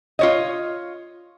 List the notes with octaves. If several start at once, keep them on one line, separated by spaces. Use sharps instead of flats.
F4 C#5 D#5